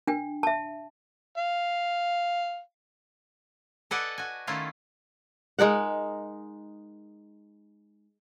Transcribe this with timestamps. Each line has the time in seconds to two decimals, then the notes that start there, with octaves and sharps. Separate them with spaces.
0.07 D4 G5
0.43 E5 A5
1.38 F5
3.91 A4 B4 D5 D#5 F#5 G#5
4.18 F#4 G#5
4.47 D#3 A3 C#4 E4 F4
5.59 G#3 D#4 A#4 F#5